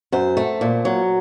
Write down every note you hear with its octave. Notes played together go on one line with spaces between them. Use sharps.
F#2 C5
A3
A#2
F#3